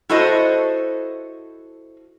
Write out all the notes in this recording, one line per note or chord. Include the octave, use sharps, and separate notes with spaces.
E4 F#4 A4 C5 D#5